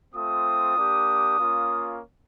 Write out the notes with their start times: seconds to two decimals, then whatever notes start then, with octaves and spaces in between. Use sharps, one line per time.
0.15 A3 C4 F4 D#6
0.76 A#3 D4 G4
1.39 A#3 C#4 F4